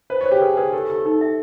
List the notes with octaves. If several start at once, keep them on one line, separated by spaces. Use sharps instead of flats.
B4 C5
C#5
C5
G4
G#4 B4
G#4 B4
G4 A4
G4 A4
D#4 A4
E5